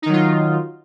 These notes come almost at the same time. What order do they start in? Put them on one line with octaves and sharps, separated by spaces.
D#4 D#3 F#3 F4